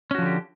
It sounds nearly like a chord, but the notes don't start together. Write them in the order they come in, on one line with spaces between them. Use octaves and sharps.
C#4 F#4 F3 D3 G4